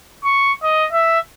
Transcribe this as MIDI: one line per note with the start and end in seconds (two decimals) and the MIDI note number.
0.24 0.53 85
0.63 0.87 75
0.92 1.20 76